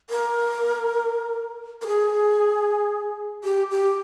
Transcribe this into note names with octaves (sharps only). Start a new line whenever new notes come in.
A#4
A#4
G#4
G4
G4